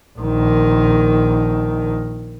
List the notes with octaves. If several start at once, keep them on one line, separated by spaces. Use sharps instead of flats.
A#1 D#3